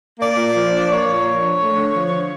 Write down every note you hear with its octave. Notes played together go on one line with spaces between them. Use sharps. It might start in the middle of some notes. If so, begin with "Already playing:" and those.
A#3 D5
A#2
F3
D4
A#3 C#5
A#2
F3
D4
A3
D3
F3
D3